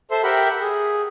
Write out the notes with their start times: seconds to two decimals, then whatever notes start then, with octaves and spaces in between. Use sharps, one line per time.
0.11 A4 C5 E5 C6
0.23 G4 A#4 E5 F#5 G5 B5
0.61 G#4